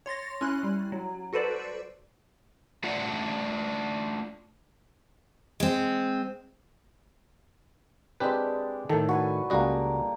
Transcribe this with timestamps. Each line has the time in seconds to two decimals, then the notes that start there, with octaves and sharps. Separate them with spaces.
0.06 C#5 C6 A6 A#6
0.41 C#4 E4 C6 F#6
0.63 G3
0.92 F#3
1.33 F#4 A4 B4 C5 D5
2.84 A3 D4 F4 D5 E5 F#5
5.60 G#3 C4
8.20 G#3 C4 D4 G4 B4
8.89 A2 D#3 A4
9.09 F#4 B4 G#5
9.50 C#2 G3 G#3 A#3 F#4 D#5